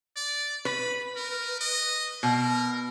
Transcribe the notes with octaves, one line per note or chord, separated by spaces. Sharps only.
D5
B4 B5
A#4
D#5
B2 A#4